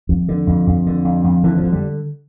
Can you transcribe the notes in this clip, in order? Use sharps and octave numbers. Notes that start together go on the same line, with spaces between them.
F2
D3
F2
F2
D3
F2
F2
D3 E3
F3
D3
G3